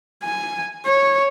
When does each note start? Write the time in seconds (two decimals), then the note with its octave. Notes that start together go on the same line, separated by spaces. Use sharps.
0.23 G#5
0.86 C#5